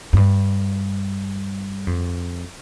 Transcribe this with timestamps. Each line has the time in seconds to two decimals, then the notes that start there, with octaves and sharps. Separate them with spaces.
0.13 F#2
0.17 G2
1.87 F2